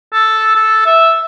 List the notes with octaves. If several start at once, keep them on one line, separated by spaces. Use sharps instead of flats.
A4
A4
E5